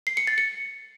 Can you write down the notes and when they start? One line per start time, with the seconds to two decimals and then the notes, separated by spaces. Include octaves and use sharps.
0.07 C7
0.17 C#7
0.27 A6
0.38 C#7